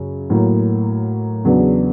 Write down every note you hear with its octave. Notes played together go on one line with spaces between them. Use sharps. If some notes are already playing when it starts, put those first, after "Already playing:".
Already playing: F#2 C#3
A2 F#3 A#3
E2 C#3 F#3 B3 D4